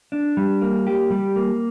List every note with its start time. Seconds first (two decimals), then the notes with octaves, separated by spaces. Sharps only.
0.12 D4
0.37 G3
0.61 A#3
0.87 G4
1.10 G3
1.36 A#3